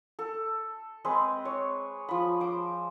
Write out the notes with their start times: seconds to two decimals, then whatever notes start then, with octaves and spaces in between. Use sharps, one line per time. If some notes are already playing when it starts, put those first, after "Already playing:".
0.19 A4
1.05 G#3 C4 G#4 B4
1.45 C#5
2.09 F3 B5
2.40 C5 D6